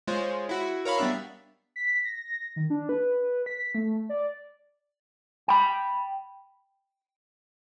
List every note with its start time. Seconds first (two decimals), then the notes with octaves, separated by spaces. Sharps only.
0.07 G#3 F4 C5 C#5
0.49 E4 F#4
0.85 A#4 C#5 F5 B5
0.98 G3 B3 D4 E5
1.76 B6
2.05 A#6
2.56 D#3
2.70 D4
2.89 B4
3.46 B6
3.58 B6
3.75 A3
4.09 D5
5.48 G5 B5